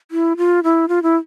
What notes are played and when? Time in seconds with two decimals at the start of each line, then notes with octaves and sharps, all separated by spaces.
0.11 E4
0.37 F4
0.63 E4
0.89 F4
1.03 E4